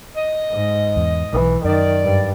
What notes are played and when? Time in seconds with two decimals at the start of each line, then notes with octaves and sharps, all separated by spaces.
0.15 D#5
0.51 G#2
0.96 E2
1.33 B1 E3
1.64 F#2 D#3 D5
2.04 G2